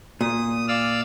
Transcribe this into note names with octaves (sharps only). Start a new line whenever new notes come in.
A#2 D#6
D5 F5 E6